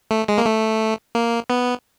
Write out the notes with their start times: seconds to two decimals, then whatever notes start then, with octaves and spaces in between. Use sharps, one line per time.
0.11 A3
0.28 G#3
0.38 A#3
0.46 A3
1.15 A#3
1.50 B3